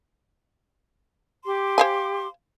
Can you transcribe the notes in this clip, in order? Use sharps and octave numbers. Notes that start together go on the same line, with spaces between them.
G4 C6 D6
C5 F5 G#5